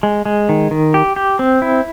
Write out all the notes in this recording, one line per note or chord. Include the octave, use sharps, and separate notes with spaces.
G#3
G#3
D#3
D#3
G4
G4
C4
E4